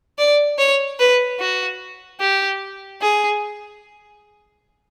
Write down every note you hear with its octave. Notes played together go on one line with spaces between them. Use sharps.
D5
C#5
B4
F#4
G4
G#4